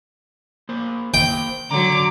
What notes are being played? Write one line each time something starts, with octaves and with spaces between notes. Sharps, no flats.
A#3 C5
A#3 C5 G5
D3 F#3 A#5 D6